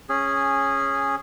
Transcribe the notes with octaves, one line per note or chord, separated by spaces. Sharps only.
C#4 G#4